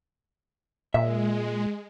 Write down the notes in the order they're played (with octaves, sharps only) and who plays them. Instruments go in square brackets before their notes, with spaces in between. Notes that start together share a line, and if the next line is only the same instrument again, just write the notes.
[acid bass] A#2 [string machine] G#3 [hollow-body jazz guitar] E5